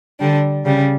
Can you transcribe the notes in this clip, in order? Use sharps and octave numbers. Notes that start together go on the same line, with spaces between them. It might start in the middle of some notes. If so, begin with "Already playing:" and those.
D3 G3 D4
C#3 G3